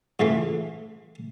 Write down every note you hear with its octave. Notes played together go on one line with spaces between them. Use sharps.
G#2 C#3 E3 F3 A3